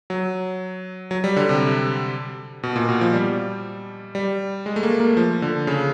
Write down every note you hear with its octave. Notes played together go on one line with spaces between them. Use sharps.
F#3
F#3
G3
D3
C3
B2
A#2
B2
F3
G3
G3
G#3
A3
A#3
A#3
F3
D3
C#3